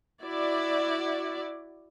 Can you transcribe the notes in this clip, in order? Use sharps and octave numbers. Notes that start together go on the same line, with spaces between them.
E4 F#4 D5